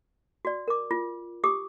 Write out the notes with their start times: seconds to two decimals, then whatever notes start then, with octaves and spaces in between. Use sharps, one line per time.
0.45 F#4 D5
0.68 A#4 D6
0.91 F4
1.44 G4 D6 D#6